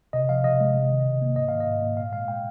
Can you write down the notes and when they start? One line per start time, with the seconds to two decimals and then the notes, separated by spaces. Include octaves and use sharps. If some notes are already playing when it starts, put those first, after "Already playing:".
0.13 C3 D#5
0.29 F3 F5
0.44 C3 D#5
0.60 G#3
0.74 C3
0.90 D#3
1.05 C3
1.22 A#3
1.36 G#2 D#5
1.49 D#3 F5
1.60 D#5
1.67 G#2
1.82 A#3
1.97 A#2 F5
2.12 G#3 F5
2.28 G#3 G5